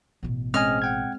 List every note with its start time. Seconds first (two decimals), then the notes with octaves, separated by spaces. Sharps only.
0.23 A1 B2
0.54 G#3 C4 C#4 D#5 G#5 F6
0.82 F#5 G5 G#6